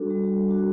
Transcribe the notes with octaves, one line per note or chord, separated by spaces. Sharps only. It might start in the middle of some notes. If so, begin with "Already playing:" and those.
Already playing: G3 D4 F#4 A4
G3
D4 F#4